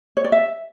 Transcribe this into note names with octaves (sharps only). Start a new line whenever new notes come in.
C#5
D5
E5